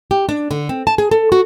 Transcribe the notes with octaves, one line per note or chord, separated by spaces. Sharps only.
G4
D4
D3
C4
A5
G#4
A4
F#4